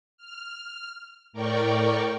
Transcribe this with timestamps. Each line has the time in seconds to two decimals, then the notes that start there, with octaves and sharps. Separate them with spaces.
0.18 F6
1.33 A2 A#4 D5 G5 C#6